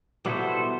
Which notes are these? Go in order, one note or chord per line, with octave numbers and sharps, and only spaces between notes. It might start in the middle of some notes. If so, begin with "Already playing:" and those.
B2 G3 B3 E4 A4 C5